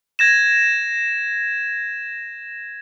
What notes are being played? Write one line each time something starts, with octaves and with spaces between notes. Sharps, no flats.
G#6 A#6 E7